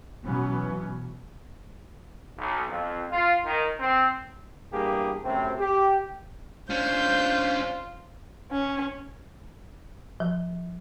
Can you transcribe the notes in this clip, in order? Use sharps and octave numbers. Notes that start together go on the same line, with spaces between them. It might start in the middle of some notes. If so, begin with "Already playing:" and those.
B2 E3 F#3 B3 C#4
B1
F2
F4
D#3
C4
E2 G2 A#3 G4 G#4
F#2 A2 C3 C4
G4
C#4 D4 F4 C5 G6
C#4
F3